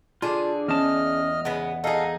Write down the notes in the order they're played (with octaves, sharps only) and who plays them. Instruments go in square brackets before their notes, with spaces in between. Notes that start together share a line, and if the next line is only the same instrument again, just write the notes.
[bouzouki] D3 G#4 [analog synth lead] D4 [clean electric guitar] F4
[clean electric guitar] E2 A5 [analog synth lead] C#4 [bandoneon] D#5 F6
[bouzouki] C#3 G#3 B3 [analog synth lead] F#5
[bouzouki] D#4 G#4 [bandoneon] A4 F5